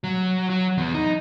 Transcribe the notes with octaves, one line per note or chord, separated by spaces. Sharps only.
F#3
F#3
E2
D#4